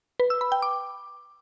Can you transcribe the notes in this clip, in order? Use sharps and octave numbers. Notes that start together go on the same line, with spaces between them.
B4
E6
B5
G5
D6